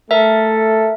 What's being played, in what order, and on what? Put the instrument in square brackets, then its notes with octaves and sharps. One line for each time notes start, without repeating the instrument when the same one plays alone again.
[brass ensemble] A3 A4 [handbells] A#4 E5